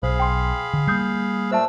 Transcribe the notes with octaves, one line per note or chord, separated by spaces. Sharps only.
B1 G#4 C5 F5 B5
G5 C6
D3
G3 A#3 D#6 G6 C7
A#2 A3 C5 E5 A5 E6